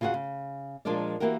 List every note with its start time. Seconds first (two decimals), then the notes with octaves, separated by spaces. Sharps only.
0.01 C#3 F4 F#4 G#4 F#5
0.14 C#3
0.85 A#2 F3 G#3 D4 A#4 D5
1.20 E3 F#3 A#3 F#4 G4 A#4